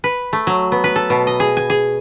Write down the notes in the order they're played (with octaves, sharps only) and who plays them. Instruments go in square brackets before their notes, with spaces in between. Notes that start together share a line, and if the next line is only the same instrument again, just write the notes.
[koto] B4
A3
F#3
B3
B4
A4
B2
D#5
G#4
G#5
G#4